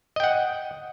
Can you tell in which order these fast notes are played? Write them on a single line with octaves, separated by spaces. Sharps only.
D#5 G5 F#5